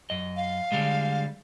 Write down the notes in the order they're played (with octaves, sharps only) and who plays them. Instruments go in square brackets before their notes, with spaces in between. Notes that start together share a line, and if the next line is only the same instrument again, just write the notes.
[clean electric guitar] F#2 D#5
[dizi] F5
[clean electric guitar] D3 G3 G#3